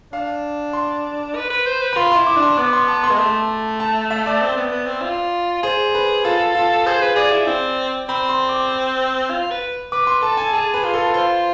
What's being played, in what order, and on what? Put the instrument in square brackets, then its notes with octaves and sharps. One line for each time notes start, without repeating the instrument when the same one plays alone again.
[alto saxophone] D4 [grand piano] F5
[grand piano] C6
[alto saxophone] B4
B4
C5
B4
[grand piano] B5
[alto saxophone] F4 [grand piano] C6
[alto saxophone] E4 [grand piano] C6
[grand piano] D6
[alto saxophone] D4
[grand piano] C6
[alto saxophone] B3 [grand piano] D6
[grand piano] C6
A5
C6
[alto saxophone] G#3
[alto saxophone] A3 [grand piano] C6
[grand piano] A5
E5
D5
[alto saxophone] C4
B3
B3
C4
F4
[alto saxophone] G#4 [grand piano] C5
[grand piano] B4
[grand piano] F4 [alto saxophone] A4
[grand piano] F4
[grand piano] G#4 [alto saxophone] C5
[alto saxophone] B4
[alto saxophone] G#4 [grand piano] D5
[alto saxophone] E4
C4
[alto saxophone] C4 [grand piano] B5
[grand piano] C6
D6
[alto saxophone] F4
B4
[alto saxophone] B4 [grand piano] D6
[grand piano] C6
[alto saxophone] A4 [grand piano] A5
[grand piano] G#5
[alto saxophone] G#4 [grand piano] A5
[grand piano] B4
[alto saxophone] F4
[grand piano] A4
[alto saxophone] F4 [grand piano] C5